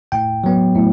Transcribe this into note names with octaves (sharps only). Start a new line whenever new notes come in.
A2 G5
F#3 B3
A2